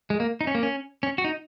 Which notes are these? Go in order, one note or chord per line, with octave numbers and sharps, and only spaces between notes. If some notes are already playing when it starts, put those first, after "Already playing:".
G#3
A#3
D#4
C#4
A#3
C#4
C#4
F#4
D#4